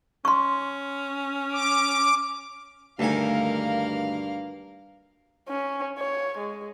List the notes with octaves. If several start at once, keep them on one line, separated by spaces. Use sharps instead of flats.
C#4 C6 C#6
D6
D2 G2 D#3 A#3 F5 G#5
C#4
C#5
G#3